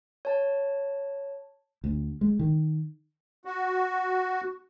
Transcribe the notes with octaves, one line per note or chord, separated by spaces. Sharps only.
C#5 A5
D2
G#3
D#3
F#4